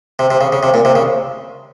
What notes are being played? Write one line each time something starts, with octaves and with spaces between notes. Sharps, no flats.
C3
C3
C#3
C#3
C3
A#2
C3
C#3